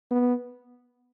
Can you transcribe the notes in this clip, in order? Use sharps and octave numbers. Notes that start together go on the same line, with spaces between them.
B3